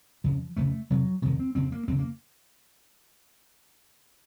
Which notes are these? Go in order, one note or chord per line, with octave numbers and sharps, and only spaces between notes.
F2 C#3 F3
F2 C#3 A3
F2 C3 F#3
F2 C3 D#3
C4
F2 C#3 C4
A#3
F2 C#3 C4
A#3